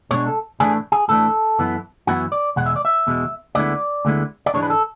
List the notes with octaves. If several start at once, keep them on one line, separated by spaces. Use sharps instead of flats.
B2 G#3 D4 C#5
A4
A2 E3 A3 D4 G#4
G#4
A2 E3 A3 D4 A4
F#2 E3 B3 E4
F#2 E3 B3 E4 F#4
D5
E2 B2 G#3 F#5
E5
D5
E5
E2 B2 G#3
D2 D3 G#3 B3 E4 D5
D2 D3 G#3 B3 E4
D5
G#2 E3 G#3 D4 C#5
B4
A4